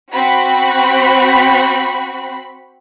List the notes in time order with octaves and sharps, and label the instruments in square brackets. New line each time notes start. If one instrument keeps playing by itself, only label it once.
[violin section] C4 F#4 B5